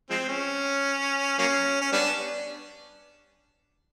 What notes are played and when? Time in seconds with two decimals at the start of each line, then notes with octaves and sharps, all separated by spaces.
0.10 F3 G#3 C4
0.28 C#4
1.39 F#3 A#3 C#4
1.81 C#4
1.92 G3 B3 D4